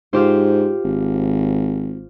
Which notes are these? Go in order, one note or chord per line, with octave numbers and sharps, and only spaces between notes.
G#2 F4 G4 C5
G#1